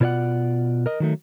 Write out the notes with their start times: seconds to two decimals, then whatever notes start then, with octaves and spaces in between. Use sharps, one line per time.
0.01 B2 F4 C#5 D5 F#5
0.86 A#4 D#5
1.00 D#3 F#3 A3